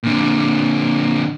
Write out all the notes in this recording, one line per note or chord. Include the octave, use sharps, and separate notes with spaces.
A#2 D3